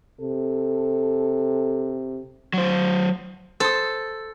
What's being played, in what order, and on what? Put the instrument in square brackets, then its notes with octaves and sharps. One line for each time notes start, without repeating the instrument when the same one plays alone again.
[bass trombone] C3 [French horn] A4
[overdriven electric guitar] F#3 C5
[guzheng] A4 [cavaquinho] C5 D#6